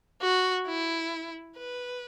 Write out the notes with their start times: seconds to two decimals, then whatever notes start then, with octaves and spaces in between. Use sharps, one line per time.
0.22 F#4
0.67 E4
1.57 B4